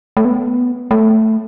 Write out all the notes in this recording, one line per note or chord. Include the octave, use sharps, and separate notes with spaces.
A3
B3
A3